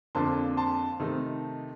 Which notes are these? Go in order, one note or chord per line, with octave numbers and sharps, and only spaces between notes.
F2 D3 F3 A#3 D4 A5 C6
A5 C6
C3 D#3 A3 D#4